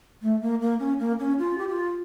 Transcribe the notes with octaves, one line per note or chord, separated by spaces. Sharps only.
A3
A#3
A#3
C#4
A#3
C#4
F4
G4
F4